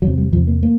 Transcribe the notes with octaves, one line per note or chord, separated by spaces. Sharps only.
E2 C3 F#3
G3
E2 C3 F3
A#3
A#3